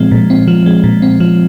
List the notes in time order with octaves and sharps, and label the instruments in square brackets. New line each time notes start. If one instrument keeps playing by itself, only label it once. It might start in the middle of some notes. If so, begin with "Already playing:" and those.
Already playing: [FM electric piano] A#2 F3 G#3 C4
A#2
C4
F3
G#3
A#2
C4
F3